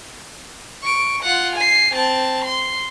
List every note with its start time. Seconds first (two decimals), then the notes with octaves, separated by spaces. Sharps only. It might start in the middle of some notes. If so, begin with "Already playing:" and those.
0.83 C#6 D7
1.23 F4 F#5
1.56 G#5 C7
1.94 C4 A5
2.45 C6